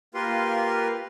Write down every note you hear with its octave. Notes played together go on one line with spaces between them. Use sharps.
A#3 F4 G4 A#4 B4 C6